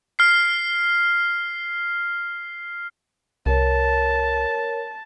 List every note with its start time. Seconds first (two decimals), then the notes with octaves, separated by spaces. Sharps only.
0.19 F6 C7
3.46 C2 A#4 C#5 A5